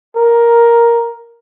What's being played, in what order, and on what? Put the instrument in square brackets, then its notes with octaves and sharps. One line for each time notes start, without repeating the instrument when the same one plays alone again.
[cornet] A#4